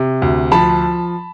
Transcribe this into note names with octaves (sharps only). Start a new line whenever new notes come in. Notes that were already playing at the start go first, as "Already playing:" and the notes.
Already playing: C3
D2
F3 A5 B5